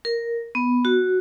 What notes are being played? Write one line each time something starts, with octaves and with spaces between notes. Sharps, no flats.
A#4
B3
F#4